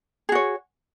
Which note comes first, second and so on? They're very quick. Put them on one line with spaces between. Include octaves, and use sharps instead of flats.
G#4 F#4 C#5